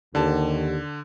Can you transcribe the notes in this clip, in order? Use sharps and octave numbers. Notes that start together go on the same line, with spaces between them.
D#2 D3 A5